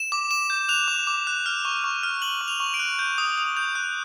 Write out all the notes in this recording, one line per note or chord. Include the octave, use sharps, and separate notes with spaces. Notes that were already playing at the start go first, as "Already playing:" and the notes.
Already playing: E7
D6
D6 E7
G6
F#6 F7
D6
D6
F#6
F6
C#6
C#6
F6
F#6 F#7
C#6
F7
C#6
D7
F#6
G6
D#6
D#6
G6
F#6